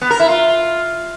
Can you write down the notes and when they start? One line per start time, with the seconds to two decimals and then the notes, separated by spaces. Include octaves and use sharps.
0.01 B3
0.10 A#4
0.19 E4
0.28 F4